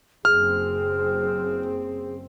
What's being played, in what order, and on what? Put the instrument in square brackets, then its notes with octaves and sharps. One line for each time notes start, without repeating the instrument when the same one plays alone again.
[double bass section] F#1 C4 [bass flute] G#4 [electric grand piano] F6